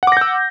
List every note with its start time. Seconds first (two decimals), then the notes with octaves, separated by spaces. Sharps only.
0.03 F#5
0.07 D6
0.12 A#6
0.17 G6
0.21 E6